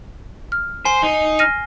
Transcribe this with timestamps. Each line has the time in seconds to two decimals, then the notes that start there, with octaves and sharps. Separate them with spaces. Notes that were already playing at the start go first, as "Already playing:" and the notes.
0.52 F6
0.85 C5 G#5 C7 G7
1.03 D#4
1.39 F6 A#6 D#7